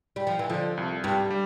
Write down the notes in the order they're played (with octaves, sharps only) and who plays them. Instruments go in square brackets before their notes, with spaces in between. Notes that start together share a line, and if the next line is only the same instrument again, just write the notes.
[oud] G3
F3
E3
[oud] D3 [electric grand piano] F3
[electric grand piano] C2
[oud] G2 [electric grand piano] G3
[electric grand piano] G3